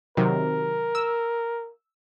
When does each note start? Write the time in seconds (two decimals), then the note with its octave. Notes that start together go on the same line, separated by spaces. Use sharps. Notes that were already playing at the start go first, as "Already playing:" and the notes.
0.17 C3 D#3 F#3 A#4
0.95 E6